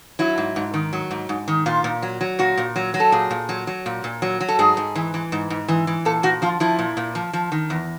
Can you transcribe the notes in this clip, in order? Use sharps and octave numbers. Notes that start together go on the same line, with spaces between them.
F#3 E4
G#2
G#2
D#3
F#3
G#2
G#2
D#3
A#2 F4
A#2
F#3
F#3
A#2 F#4
A#2
F#3
F#3
A4
A#2 G#4
A#2
F#3
F#3
A#2
A#2
F#3
F#3
A4
G#2 G#4
G#2
E3
E3
G#2
G#2
E3
E3
A#2 A4
A#2 F#4
F3 F4
F3 E4
A#2
A#2
F3
F3
D#3
E2